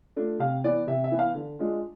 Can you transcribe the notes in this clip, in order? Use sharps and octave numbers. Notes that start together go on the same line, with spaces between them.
A3 D4 F4
C3 F5
E3 B3 D5
C3 E5
E5
E3 B3
F5
D3
G#3 D4 F4